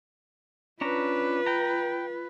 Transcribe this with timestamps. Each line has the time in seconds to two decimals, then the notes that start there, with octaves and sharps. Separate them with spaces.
0.81 C#4 D4 F4 B4 A#5
1.46 G5 A#5